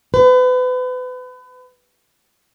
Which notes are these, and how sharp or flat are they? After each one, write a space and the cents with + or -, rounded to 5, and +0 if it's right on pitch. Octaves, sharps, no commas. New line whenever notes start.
B4 +35